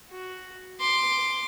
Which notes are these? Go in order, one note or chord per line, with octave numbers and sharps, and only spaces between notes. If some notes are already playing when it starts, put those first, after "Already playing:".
F#4
C6 D6